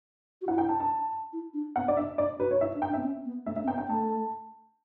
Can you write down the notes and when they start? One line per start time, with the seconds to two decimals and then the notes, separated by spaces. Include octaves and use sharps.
0.42 F#4
0.47 E4 F#5
0.58 G5
0.69 A5
0.80 A5
1.33 E4
1.54 D4
1.76 B3 F#5
1.88 D5
1.97 D4 E5
2.18 D4 D5
2.39 F#4 B4
2.51 C#5
2.61 E4 E5
2.75 D4
2.82 G5
2.89 D4
2.94 E5
2.98 B3
3.04 C#4
3.25 B3
3.46 A3 E5
3.56 E5
3.63 C#4
3.67 B3 G5
3.78 G5
3.89 A3 A5